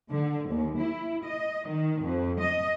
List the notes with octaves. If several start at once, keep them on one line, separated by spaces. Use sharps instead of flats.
D3
D#2
E4
D#5
D#3
F2
D#5